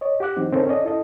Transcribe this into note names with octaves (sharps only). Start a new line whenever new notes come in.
C#5 D#5
G4 F#5 D6 F#6
E3 F#3 C4 D#4
D3 C4 C#4 D#4 A4 A#4
C#4 A4 D5 D#5
E4 A4 D#5